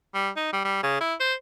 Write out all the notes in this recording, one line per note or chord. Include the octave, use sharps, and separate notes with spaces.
G3
D#4
G3
G3
C#3
E4
C5